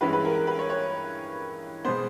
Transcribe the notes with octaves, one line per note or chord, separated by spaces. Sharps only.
G2 E3 G#3 C#4 E4 B4
B4
A#4
A#4
B4
C#5
C#5
B2 G#3 B3 C5